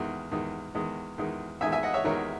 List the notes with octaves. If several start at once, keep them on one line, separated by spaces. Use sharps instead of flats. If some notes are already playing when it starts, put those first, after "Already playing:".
Already playing: E2 D#3 G#3
E2 D#3 G#3
E2 D#3 G#3
E2 D#3 G#3
E2 D#3 G#3 E5 G#5
E5 G#5
D#5 F#5
C#5 E5
E2 D#3 G#3 A#4 C#5